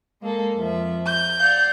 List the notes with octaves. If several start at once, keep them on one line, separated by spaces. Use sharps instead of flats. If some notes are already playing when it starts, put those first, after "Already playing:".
G#3 A#3 A4
F2 F3 E5
G6
D5 F5 F#5